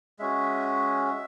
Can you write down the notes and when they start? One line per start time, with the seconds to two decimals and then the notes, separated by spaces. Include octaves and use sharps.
0.19 G#3 C#4 F#4 E5